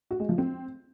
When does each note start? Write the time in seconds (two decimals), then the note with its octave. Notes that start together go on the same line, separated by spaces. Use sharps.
0.11 F#4
0.20 G#3
0.29 F3
0.38 C4